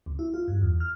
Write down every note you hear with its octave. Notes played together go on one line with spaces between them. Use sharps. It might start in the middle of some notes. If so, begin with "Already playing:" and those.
C#2
E4
F4
G2
E2
F6